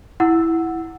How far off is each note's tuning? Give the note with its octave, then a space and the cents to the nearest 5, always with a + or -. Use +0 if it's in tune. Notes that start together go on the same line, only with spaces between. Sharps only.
E4 +0 F#5 +0 E6 +0